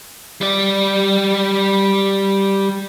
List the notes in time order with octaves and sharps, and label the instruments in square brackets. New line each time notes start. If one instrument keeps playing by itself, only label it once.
[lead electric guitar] G3 D5